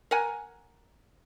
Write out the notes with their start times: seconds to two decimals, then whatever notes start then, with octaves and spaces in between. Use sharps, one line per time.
0.11 A#4 F#5 G#5